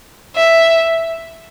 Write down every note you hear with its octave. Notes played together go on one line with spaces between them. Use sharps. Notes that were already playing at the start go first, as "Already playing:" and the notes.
E5